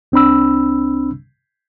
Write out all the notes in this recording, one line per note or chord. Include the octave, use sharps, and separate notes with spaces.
C2 C4 D4 B5 E6